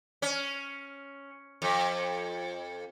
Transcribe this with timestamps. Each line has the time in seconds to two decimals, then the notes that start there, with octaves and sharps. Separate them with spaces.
0.22 C#4
1.62 F2